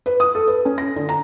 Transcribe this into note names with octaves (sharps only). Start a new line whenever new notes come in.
B4
D#6
A4
B4
C#4
A#6
D3
A#5